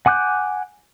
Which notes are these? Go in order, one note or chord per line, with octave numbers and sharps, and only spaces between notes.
F#5 G#5 D6 F#6 G6